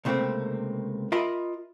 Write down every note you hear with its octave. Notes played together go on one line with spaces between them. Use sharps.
C#2 C3 A3 A#3 C4
F4 A#4 D#5 E5 B5